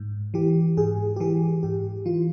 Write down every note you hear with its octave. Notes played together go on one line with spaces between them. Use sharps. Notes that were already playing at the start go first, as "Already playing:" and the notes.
Already playing: G#2
E3 G4
G#2 G#4
G4
E3 G#4
G#2 G4
E3 F4